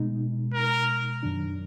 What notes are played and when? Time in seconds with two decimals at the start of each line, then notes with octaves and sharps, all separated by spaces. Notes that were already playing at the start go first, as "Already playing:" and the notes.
Already playing: B2 G#3 D#4
0.54 A#4
1.23 F#2 D#3 F#3 D4